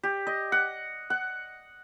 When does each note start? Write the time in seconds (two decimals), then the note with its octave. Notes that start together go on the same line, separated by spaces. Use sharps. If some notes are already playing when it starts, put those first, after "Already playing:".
0.03 G4
0.27 D#5
0.52 F#5
1.10 F#5